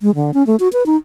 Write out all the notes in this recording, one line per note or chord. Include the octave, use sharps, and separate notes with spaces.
G#3
D3
C#4
A3
F#4
B4
D#4